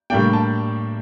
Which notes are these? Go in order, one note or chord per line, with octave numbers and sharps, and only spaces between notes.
A2 G3 A#3 D4 G5
A5